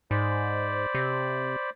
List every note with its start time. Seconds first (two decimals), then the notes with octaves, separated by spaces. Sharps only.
0.11 G#2 C5 D5 B5
0.95 C3